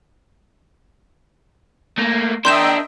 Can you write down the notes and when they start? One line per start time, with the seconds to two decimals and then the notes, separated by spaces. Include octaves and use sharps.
1.98 A3 A#3
2.45 D4 A#4 D#5 E5 G5 C6 G6 E7